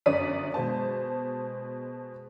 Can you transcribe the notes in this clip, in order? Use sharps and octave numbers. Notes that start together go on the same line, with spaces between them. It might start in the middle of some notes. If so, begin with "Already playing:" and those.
G1 F#2 D5 D#6 B6 D#7
B2 G#3 C5 A5